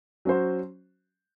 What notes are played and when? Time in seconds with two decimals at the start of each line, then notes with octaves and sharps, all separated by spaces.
0.25 F#3 C#4 F#4 C5